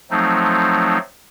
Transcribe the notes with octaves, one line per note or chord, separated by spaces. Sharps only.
F3 F#3 A3 C4 D#4